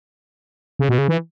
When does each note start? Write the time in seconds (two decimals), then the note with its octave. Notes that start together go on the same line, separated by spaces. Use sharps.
0.79 C#3
0.89 B2
0.98 C#3
1.08 E3